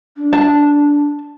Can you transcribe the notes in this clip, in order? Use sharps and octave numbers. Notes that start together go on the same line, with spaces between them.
D4
A5